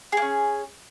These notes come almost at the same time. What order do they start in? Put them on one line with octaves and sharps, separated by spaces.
G#4 A#3 C#4